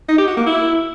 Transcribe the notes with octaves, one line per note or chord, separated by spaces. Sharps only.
D#4
G4
F#4
A#3
E4